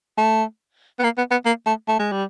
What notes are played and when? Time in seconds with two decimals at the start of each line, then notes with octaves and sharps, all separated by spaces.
0.18 A3
0.99 B3
1.04 A#3
1.18 B3
1.31 B3
1.45 A#3
1.66 A3
1.88 A3
1.99 G#3
2.12 G3